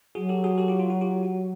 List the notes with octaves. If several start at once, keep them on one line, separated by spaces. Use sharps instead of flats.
F#3 F#4 G#4
G4 A4
F#4 G#4
G4 A4
F4 G4
F4
F#4
F4 G4
F#4